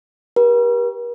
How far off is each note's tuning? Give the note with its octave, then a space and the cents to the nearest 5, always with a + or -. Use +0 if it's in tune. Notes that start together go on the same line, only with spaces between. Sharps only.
G4 +0 A#4 +45